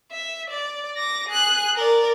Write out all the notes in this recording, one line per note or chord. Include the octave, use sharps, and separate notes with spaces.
E5
D5
D6 A#6
G#4 F#6
A#4 D5